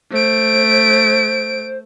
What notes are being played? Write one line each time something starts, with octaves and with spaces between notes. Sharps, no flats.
A3 C5 D7